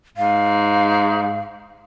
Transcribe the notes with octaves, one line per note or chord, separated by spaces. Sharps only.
G#2 F5